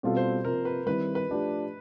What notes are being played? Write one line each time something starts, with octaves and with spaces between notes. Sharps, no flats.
B2 G3 C4 F4 A4
C5
C3 F3 A#3 A#4
B4
D#3 G3 C4 E4 B4
B4
F3 A3 D4 G4